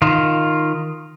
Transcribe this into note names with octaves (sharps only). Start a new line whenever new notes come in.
D#3 F4